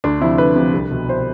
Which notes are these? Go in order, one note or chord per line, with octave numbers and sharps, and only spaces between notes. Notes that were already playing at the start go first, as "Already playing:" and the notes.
D2 D4
C3 F3 E4
D2 B4
C3 F3
C2
B2
C5